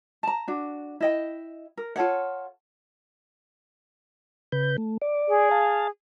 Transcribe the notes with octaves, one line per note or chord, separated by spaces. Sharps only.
A5 A#5
D4 F#4
E4 D#5 G5
A#4
F4 A4 C#5 F#5
C#3 B4 G6
A3
D5
G#4
F5 A5